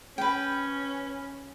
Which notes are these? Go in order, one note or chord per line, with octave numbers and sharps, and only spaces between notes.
C#4 B4 G5